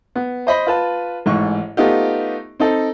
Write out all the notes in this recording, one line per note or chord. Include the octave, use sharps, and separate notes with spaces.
B3
C5 D#5 B5
F4 B4 A5
A1 G#2 C#6
A3 B3 D#4 F4 G4
C4 D#4 A4